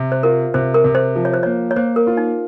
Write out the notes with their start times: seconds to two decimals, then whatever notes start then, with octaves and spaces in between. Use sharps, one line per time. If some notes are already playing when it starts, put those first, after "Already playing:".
Already playing: C3
0.12 C5
0.23 F4 A#4
0.54 C3 C5
0.74 A#4
0.84 C3
0.95 C5
1.15 F3
1.25 C#5
1.34 C5
1.43 A#3 C#5
1.71 C#5
1.76 A#3 C5
1.96 A#4
2.07 F4
2.17 D#4